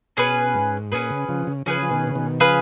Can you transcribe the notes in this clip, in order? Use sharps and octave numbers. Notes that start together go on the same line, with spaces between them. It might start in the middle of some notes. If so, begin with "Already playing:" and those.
B2 C#4 G#4 B4
G#2
A#2 C#4 G#4 B4
C#3
C#3 F3
C#3
C#3 F3 C#4 G#4 B4
F3
B2 D#3
C#3
B2 D#3
C#3 F3 G#4 B4 F5